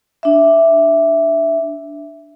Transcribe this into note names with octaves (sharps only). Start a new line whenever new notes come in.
D4 E5